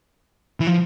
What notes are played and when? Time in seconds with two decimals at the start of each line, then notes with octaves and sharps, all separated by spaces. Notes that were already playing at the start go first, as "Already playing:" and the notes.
0.60 E3
0.67 F3